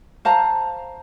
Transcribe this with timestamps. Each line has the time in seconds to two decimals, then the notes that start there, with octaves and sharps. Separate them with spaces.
0.25 C5 F5 A5 A#5